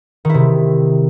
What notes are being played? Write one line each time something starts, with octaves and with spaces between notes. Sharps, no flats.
C3 D#3 E4